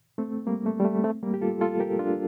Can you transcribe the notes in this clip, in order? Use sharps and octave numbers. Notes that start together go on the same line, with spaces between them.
A3 C4
G3 A#3
A3
G3
A3
A3 C4
G3 A#3
G4
F4 A4
F4 A4
G4 A#4
D4 F4